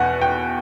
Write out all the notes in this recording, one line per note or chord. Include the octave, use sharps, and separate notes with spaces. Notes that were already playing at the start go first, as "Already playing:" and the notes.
Already playing: E2 B2 F#5
G5